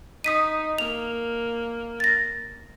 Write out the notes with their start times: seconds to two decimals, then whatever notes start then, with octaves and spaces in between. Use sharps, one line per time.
0.24 D#4 D#6 B6 D#7
0.78 A#3 F7
2.00 A6 A#6